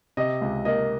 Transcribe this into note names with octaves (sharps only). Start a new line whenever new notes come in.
C3 D#5
C#2
A#3 D#5